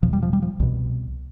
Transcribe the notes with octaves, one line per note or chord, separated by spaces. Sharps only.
E2 B2 F3
G3
F3
G3
F3
C2 B2